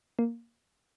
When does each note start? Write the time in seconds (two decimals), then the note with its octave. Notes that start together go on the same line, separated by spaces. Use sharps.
0.19 A#3